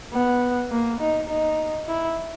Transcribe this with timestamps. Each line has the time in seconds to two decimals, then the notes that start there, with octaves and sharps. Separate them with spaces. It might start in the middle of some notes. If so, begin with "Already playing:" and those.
0.13 B3
0.71 A#3
1.00 D#4
1.29 D#4
1.87 E4